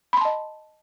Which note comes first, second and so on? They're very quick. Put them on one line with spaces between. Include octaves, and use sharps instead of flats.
B5 C6 A5 D#5